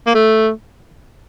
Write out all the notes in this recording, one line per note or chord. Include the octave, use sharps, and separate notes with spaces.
A#3
A3